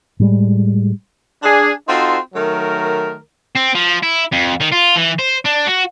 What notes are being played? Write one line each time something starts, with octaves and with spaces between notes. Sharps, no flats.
A2 G3 G#3
D4 G#4
C4 D#4 F4 F#4 A4 C5
D#3 F#3 A3 A#4
C4
F3
E4
F2
D#3
F4
E3
C5
D4
F#4